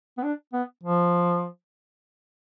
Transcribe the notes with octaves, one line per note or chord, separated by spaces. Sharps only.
B3
D4
B3
F3